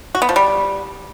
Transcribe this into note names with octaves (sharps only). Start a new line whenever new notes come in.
F#4
B3
F3
G3